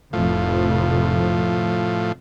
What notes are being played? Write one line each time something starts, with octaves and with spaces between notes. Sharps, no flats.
F1 F2 A2 F3